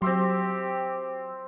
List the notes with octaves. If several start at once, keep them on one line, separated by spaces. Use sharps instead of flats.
F#3 C4 G4 E5 C6